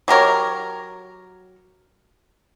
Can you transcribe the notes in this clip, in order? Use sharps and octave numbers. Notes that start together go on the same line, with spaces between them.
F#3 G4 A#4 C#5